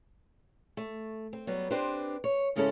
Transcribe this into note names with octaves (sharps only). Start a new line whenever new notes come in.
A3
C4
F#3 G3 B3
C4 D4 G4 B4 C5
C#5
G#2 C#3 G#3 C#4 E4 A4